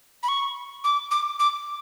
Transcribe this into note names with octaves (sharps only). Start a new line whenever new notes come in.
B5
C#6
D6
D6
D6